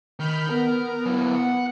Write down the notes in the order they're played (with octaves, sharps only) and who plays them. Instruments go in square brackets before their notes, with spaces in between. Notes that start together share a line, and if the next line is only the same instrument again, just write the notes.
[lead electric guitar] D#3 [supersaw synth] B5 F6 G6
[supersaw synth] B3 [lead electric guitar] A#4
[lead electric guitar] F#3 E4
F#5